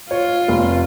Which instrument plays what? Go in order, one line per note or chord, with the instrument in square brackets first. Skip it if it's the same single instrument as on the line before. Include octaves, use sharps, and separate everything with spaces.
[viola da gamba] F4 [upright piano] C#5
[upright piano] F1